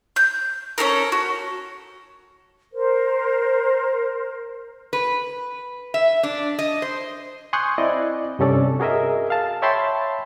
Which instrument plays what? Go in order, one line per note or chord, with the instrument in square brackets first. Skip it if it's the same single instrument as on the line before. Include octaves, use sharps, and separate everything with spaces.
[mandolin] G6
C#4 D4 A4 A#4
F#4
[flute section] A#4 C5
[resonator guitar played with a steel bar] B4
E5
D4
D#5
C5
[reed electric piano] G#5 C6 C#6 D#6 F#6 G6
C4 E4 D5 D#5
G2 C3 C#4 A4 D5
F#4 G#4 A#4 D#5 E5
F5 A5
C#5 E5 G5 A5 B5 C6